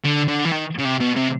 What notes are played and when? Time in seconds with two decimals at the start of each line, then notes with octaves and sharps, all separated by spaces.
0.05 D3
0.28 D3
0.45 E3
0.52 D#3
0.79 C#3
0.85 C3
1.01 B2
1.16 C3